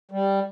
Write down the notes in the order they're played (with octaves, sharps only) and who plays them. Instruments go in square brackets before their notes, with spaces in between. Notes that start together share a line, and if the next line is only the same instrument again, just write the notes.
[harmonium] G3